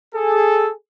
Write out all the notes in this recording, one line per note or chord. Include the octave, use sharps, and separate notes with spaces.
G#4 A4